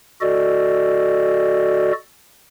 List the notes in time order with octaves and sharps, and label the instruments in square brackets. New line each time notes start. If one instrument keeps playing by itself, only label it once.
[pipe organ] F#4 A4 D5 D#5